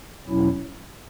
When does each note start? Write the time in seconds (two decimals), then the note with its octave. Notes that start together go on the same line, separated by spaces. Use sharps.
0.25 E2 B2 F#3 C#4 E4